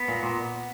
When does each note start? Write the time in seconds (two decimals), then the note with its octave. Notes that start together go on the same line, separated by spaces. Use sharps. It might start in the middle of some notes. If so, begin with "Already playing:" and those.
Already playing: B3
0.08 A#2
0.23 A#2